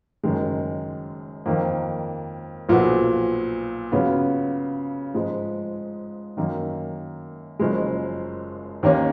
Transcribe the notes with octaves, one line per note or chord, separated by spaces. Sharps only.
F#1 F#2 D#3 G#3
F2 D#3 A#3
B1 A#2 F3 B3 F#4
C#3 F#3 B3 F4
G#2 F3 G#3
F#2 D#3 A#3
F#1 F#2 F3 G#3
D#2 D#3 A#3 C#4